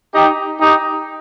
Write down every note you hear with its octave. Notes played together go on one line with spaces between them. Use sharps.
D#4 G4
D#4 G4